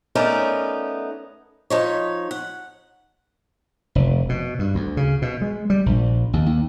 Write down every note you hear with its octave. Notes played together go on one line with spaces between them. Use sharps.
A3 B3 C#4 D#4 A#4 D5
F3 D#4 C#5
F#5
F1
B2
G2
D2
C#3
B2
G#3
G3
A#1
D#2
D#2